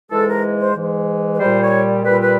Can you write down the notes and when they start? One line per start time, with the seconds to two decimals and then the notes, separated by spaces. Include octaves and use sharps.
0.11 G#2 E3 G#3 A4
0.27 A#4
0.59 C5
0.75 G#2 E3 G#3
1.34 B4
1.40 A#2 G3 C5
1.62 C#5
2.04 A#2 G3 B4
2.21 B4